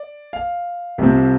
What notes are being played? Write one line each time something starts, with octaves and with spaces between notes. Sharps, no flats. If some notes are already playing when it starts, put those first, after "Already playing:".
Already playing: D5
F5
C2 C3 F3 C4